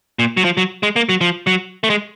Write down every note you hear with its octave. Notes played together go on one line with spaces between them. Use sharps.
A#2
F#3
F3
F#3
G#3
A#3
F#3
F3
F#3
A3
G#3